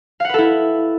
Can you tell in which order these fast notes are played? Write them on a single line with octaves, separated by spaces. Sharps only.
F5 F#5 B4 A4 E4